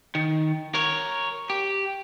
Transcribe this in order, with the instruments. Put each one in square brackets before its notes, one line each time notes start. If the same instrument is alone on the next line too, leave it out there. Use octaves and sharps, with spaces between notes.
[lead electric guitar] D#3
A#4 C#5
G4